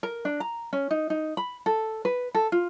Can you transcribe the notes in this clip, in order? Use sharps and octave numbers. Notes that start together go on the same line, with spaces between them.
A#4
D4
A#5
C#4
D#4
D#4
B5
A4
B4
A4
F4